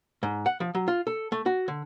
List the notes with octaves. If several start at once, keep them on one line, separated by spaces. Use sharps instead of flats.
G#2
F#5
F3
F#3
F4
A4
A3
F#4
D3